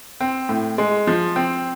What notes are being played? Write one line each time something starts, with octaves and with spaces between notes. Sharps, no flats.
C4
A2
G#3
F3
C4